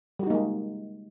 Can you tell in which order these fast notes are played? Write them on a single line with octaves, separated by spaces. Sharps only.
G3 F#4 D#4 A#3 G#3